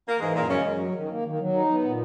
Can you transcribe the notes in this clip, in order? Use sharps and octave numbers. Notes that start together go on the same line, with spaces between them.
A#3
G#2 E3 G#3
F#2 A#2 A#3
C#3 G#3 C#4
F#2
F#3
D#3
A#3
D#3
F#3
D#4
B3
A#2